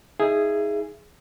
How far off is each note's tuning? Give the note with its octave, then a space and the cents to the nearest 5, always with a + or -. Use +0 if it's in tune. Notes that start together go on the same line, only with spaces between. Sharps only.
D#4 +30 G#4 +0 E5 +30